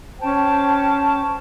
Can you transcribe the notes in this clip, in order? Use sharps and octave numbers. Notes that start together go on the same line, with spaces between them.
C#4 C5 G5 A5